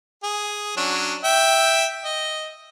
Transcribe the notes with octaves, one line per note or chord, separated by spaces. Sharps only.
G#4
F#3 C#4 D4
E5 G5
D#5